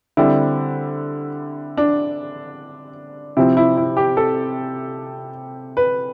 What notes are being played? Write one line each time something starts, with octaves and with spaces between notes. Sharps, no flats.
D3 G3 C4 E4
D4
C3 F3 C4 E4
E4
E4
G4
A4
B4